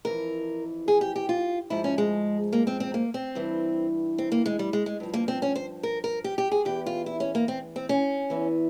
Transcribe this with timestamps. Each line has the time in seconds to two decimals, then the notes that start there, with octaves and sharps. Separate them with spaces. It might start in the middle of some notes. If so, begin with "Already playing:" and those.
0.05 F2 E3 A#4
0.88 G#4
1.01 G4
1.16 G4
1.29 F4
1.70 G#2 F3 E4
1.84 C#4
1.98 G#3
2.53 A#3
2.67 C4
2.80 C4
2.94 A#3
3.14 C4
3.35 G2 E3
4.18 C4
4.32 A#3
4.46 G#3
4.59 G3
4.73 G#3
4.86 G#3
5.00 G2 F3
5.14 A#3
5.28 C4
5.42 C#4
5.56 C5
5.83 A#4
6.04 A#4
6.24 G4
6.38 G4
6.51 G#4
6.65 E2 E3 G4
6.86 F4
7.06 E4
7.20 C#4
7.35 A#3
7.48 C4
7.76 C4
7.89 C#4
8.30 E2 E3